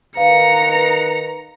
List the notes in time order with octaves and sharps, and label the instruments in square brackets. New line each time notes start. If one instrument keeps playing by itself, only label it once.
[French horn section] D#3 B4 [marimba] F5 [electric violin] A#5 C#7